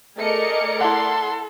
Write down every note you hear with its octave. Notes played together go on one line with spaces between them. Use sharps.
A3 G#4 A#4 D5 D#5 C#7
E4 A4 F#5 C6